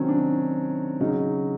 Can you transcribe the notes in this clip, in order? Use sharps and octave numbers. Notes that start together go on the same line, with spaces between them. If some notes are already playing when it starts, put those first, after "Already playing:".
Already playing: C3 D#3 F#3 C4 C#4
D4
C#3 F#3 D#4